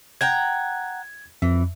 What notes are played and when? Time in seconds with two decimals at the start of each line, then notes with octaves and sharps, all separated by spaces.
0.21 F#5 G5 A#5 G#6
1.42 F2 E3